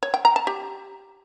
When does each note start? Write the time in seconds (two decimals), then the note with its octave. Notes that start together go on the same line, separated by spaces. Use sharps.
0.03 C#5
0.14 G5
0.25 A#5
0.36 A5
0.47 G4